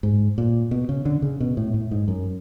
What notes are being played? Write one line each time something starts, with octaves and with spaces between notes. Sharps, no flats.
G#2
A#2
B2
C#3
D3
C#3
B2
A2
A2
G#2
F#2